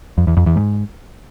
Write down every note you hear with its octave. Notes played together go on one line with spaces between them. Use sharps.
F2
E2
F2
E2
G#2